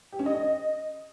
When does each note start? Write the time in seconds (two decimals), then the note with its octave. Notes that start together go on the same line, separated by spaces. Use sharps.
0.12 G4
0.19 C#4
0.26 D#5